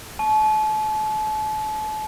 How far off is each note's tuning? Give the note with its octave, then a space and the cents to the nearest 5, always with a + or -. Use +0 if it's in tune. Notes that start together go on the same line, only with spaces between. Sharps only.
A5 -40 C#6 +0